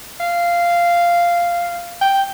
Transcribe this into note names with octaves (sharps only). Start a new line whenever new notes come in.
F5
G5